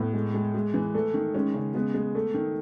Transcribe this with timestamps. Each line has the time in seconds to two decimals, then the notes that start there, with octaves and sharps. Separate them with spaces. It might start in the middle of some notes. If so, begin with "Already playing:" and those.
Already playing: A2 B3
0.14 G#3
0.34 G#3
0.54 G#3
0.74 E3
0.95 A3
1.14 D#3
1.34 G#3 C#4
1.54 C#3
1.74 G#3 B3
1.94 G#3
2.15 A3
2.34 D#3